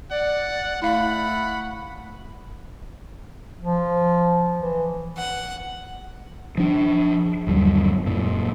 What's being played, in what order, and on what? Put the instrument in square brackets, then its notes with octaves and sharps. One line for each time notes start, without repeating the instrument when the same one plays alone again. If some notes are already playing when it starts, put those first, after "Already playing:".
[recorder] D5 [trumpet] F#5
[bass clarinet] A3 [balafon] E4 F5 [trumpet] F#5 [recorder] B5
[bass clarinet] F3
E3
[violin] F#5
[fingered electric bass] F3 D4
G1 D#2 F#3 G3
F#2 A#2